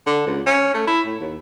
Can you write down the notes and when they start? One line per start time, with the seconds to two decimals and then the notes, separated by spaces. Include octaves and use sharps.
0.07 D3
0.27 C#2
0.46 C#4
0.75 A3
0.87 E4
1.06 A2
1.20 D#2